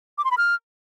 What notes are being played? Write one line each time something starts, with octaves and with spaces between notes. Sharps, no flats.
D6
C6
B5
F6